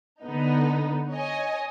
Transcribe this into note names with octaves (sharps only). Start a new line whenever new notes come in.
D3 B3 D#4
C#5 D#5 G#5